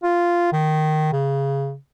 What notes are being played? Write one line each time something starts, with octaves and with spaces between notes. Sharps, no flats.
F4
D#3
C#3